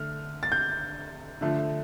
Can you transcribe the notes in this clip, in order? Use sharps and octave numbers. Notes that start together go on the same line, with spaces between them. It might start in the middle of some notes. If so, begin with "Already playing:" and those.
Already playing: D3 A3 F6
A6
G6
D3 F3 A3